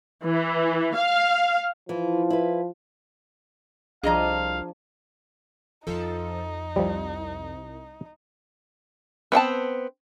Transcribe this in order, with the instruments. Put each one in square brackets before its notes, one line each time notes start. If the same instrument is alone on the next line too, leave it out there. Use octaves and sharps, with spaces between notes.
[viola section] E3
F5
[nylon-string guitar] E3 [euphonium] F3
[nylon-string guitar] E4 B4
[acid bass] C2 [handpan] F3 D4 [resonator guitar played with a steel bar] G#4 D#5 A#5 [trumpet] F5
[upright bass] F2 [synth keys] F3 A4 [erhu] D#4
[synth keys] C2 [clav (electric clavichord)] F3 G3
[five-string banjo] B3 C4 G5 A5